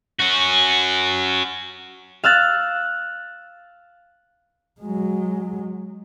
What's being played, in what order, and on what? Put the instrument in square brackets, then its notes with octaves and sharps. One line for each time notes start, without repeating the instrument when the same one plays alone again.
[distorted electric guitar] C#4 F#4
[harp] F5 E6 F#6 A6
[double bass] F#3 G#3